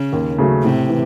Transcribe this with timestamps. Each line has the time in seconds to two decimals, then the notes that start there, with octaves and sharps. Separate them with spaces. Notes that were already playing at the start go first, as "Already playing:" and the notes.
Already playing: C#3
0.13 D#2
0.38 C#3 F#3 A3
0.63 A2 C3
0.89 E3